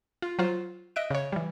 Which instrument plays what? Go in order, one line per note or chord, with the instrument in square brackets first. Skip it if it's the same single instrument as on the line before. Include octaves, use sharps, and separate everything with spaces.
[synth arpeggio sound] F4
F#3 F4 C5
D#5 E5 F#6 D7
C#3 C#5
E3 G3